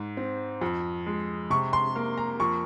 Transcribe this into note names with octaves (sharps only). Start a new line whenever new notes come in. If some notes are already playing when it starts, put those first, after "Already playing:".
Already playing: G#2
C4
F2
G#3
C3 C#6
C6
A#3
A#5
F2 C#6